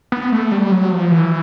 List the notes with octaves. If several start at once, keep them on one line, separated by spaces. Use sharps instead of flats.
B3
A3
G3
F#3
F3
E3